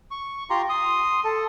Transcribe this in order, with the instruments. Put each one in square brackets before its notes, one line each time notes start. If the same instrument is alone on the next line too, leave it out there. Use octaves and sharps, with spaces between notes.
[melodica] C#6
F4 G4 A#5 C6
C6 D#6
A4